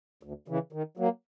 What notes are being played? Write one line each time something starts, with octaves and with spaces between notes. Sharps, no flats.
D2
C#3 E3
D#3
F#3 A#3